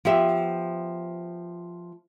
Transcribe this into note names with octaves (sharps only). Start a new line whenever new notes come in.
F3 B3 G4 E5